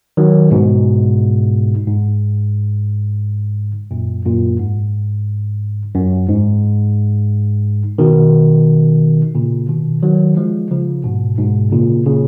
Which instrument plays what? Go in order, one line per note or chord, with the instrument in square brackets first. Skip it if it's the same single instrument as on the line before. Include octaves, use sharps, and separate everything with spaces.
[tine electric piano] D#3 F#3
G#2 B2
G#2
F#2 A#2
F#2 A#2
G#2
F#2
G#2
B2 D#3
A#2 C#3
B2 D#3
D#3 F#3
F3 G#3
C#3 F3
G#2 B2
G#2 B2
A#2 C#3
A#2 C#3